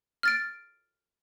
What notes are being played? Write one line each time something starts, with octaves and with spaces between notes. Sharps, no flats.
F6 A6 D7